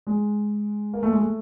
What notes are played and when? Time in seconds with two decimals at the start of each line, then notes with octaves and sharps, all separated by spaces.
0.07 G#3
0.94 A#3
1.03 A3
1.11 G#3
1.20 A3